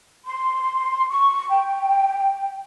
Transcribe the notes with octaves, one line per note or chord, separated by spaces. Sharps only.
C6
C#6
G5